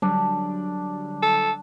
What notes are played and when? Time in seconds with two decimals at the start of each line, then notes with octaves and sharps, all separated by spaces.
0.02 D3 F#3 G3 D4
1.22 A4